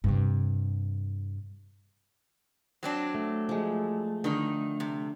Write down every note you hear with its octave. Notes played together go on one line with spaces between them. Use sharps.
G2 C3
F#3 C4 D4
A3
F3 G#3
D3 D#3 D#4 B5 C6
C3